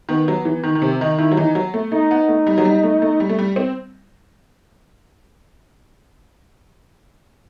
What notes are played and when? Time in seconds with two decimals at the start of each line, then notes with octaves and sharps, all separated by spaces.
0.09 D#3 B3
0.28 F#3
0.45 E3
0.64 D#3
0.75 D#3
0.82 C3 C4
1.01 D#3 D#4
1.18 D#3 E4
1.32 F#3
1.37 E3 D#4
1.55 F#3
1.74 A3
1.91 A3 D#4
2.11 B3
2.28 A3
2.47 G3
2.58 F#3
2.65 G3
2.83 A3
3.02 A3
3.20 G3
3.29 A3
3.39 G3
3.56 C4